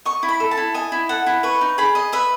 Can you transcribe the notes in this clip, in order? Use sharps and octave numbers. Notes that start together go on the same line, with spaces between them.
D#5 C#6
E4
B5
A4
A5
E4
D#5 G#5
E4
A4 F#5
E4
B4 C#6
D#4
G#4 B5
D#5
B4 E5